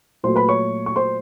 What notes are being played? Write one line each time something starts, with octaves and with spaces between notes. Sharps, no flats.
A#2 F#3 A3 C5 C6
B4 B5
C#5 C#6
C#6
C5 C6